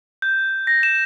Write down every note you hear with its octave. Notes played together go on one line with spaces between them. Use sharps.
G6
A#6
E7